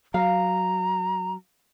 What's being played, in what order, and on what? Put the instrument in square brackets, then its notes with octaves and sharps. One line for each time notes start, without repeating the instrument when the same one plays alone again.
[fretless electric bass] F#3 [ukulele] F5 [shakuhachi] A#5